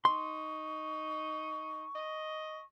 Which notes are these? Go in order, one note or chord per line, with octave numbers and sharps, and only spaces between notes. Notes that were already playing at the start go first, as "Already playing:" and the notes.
D#4 C6 C#6
D#5